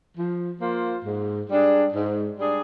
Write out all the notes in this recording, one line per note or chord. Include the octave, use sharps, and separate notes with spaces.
F3
A#3 F4 C5
G#2
G3 D4 G#4
G#2
G3 D4 G#4